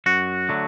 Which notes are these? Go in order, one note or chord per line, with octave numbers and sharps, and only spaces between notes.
F#2 F#4
D3 F#3 A3